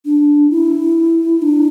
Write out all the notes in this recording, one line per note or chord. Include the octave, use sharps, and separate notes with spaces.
D4
E4
D4